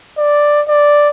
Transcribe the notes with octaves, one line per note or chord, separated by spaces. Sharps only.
D5
D5